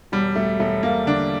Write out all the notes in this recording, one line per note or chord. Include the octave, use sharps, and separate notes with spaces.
E1 G3
E1 A3
E1 A3
E1 A#3
D3 D4